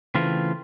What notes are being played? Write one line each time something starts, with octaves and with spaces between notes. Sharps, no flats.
C#3 E3 A3 C4 F4